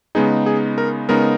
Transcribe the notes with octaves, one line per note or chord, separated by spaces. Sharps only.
C#3 G#3 B3 D#4 G#4
G#4
A#4
C#3 G#3 B3 D#4 A#4